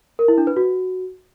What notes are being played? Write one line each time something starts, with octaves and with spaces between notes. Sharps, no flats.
A#4
E4
D4
B4
F#4